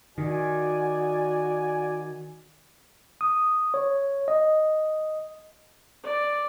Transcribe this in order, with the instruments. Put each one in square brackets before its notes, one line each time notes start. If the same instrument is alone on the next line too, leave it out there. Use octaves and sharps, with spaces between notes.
[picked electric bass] D#3 [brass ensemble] F#4 D5 G#5
[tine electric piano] D#6
C#5
D#5
[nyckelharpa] D5